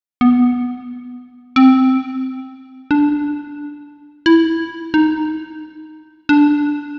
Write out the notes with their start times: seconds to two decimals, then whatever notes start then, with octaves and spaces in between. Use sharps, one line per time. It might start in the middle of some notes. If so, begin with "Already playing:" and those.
0.21 B3
1.56 C4
2.91 D4
4.26 E4
4.94 D#4
6.29 D4